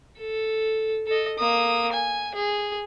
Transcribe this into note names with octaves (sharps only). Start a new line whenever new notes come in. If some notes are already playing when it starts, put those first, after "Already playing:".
A4
A4 D#5
A#3 D#6
G#5
G#4